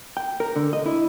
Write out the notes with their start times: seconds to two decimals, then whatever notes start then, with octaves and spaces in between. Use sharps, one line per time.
0.17 G5
0.40 A#4
0.56 D3
0.73 D#5
0.86 E4